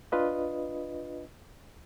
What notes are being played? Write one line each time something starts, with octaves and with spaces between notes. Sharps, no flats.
D4 F4 B4 D#5